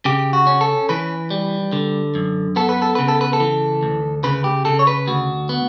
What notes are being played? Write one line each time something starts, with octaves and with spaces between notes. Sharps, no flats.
C#3 G4
F#4
C#4
A4
E3 B4
G3
D3
F#2
B3 A4
B4
A4
C#3 B4
A4
B4
A4
E3
D2
C#3 B4
G4
C#3 A4
C#5
B4
D2 F#4
B3